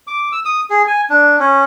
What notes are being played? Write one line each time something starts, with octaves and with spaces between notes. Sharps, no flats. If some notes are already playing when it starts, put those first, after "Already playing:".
D6
E6
D#6
G#4
G#5
D4
C#4